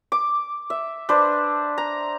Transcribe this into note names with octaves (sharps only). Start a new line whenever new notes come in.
D6
E5
D4 B4 C5
A#5